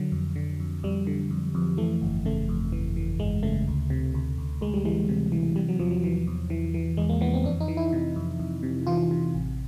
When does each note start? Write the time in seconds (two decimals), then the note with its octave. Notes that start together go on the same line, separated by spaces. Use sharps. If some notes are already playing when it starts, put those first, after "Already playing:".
Already playing: D3 F#3
0.12 F2
0.36 D3
0.60 F2
0.83 F2 G3
1.07 D3
1.30 F2
1.55 F2
1.77 E3 A3
2.02 G1
2.25 C#3 A3
2.49 F2
2.72 E3
2.96 E3
3.19 G1 G#3
3.43 C#3 A3
3.67 D2
3.90 C3
4.14 D2
4.38 D2
4.61 D2 G#3
4.74 G3
4.85 E3 G#3
5.09 C3
5.32 E3
5.56 C3 G3
5.68 F#3
5.79 E2 F3
5.91 F#3
6.04 E3
6.27 E2
6.50 E3
6.74 E3
6.97 E2 G#3
7.09 A#3
7.21 E3 B3
7.34 C4
7.44 F2 D4
7.60 D#4
7.68 E3
7.77 E4
7.93 C3
8.16 F2
8.40 F2
8.63 C3
8.87 E3 F4
9.11 C3
9.35 A1